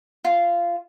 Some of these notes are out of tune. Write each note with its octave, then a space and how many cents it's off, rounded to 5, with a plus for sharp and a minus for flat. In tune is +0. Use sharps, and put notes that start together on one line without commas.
F4 -15